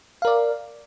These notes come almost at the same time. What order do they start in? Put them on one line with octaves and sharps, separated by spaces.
F5 A#4 D5